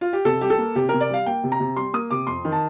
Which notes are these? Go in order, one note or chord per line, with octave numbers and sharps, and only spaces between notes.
F4
G4
C3 A4
G3 G4
A4
A#3
C3 G4
C3 A#4
D5
G3 F5
A#3 G5
C3
A#5
C3
G3 C6
A#3 D#6
C3 D6
F2 C6
D#3
A5